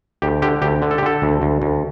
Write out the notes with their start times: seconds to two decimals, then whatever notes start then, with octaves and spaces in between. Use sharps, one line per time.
0.22 D2 G4
0.42 D3 G4
0.62 D2 G4
0.82 D3
0.91 A4
0.98 G4
1.02 D3 A4
1.22 D2
1.42 D2
1.62 D2